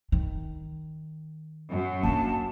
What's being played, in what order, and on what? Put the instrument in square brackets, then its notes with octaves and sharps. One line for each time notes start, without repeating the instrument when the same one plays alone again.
[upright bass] D#3
[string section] F#2
[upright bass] A#3 D4 [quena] A5